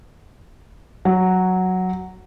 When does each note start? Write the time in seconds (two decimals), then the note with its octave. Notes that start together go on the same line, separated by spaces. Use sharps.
1.05 F#3